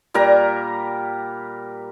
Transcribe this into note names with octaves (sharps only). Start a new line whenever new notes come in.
A#2 G3 A#4 A#5